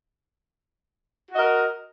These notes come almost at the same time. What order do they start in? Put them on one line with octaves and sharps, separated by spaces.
F#4 D#5 A#4